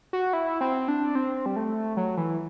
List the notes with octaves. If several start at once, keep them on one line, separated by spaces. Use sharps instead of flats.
F#4
E4
C4
D4
C4
G3
A3
F#3
E3